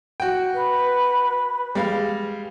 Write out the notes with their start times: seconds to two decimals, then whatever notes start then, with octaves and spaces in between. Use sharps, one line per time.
0.20 F#4 G5
0.54 B4
1.75 G3 G#3 F5